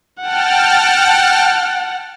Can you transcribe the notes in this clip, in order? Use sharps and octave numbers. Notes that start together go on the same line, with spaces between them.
F#5 G5 A5 F6